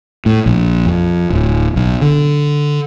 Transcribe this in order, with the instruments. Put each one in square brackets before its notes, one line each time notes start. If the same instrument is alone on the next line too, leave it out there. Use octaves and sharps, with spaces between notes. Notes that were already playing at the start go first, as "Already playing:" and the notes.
[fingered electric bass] A2
A#1
F2
D1
B1
D3